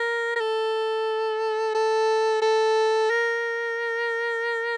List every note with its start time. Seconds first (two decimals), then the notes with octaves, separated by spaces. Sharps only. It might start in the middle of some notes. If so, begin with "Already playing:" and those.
Already playing: A#4
0.36 A#4
0.40 A4
1.75 A4
2.42 A4
3.10 A#4